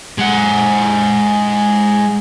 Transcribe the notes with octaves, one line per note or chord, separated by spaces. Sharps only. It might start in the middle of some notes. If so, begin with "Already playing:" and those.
G#3 F#5